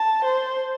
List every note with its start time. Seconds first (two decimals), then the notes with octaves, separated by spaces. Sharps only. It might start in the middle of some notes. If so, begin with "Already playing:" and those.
Already playing: A5
0.24 C5